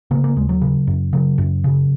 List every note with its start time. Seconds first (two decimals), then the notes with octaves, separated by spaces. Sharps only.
0.11 C#3 A#3
0.24 A#3
0.36 D#2 G#3
0.49 F#3
0.62 C#3
0.87 F#2
1.13 C#3 F#3
1.38 F#2
1.64 C#3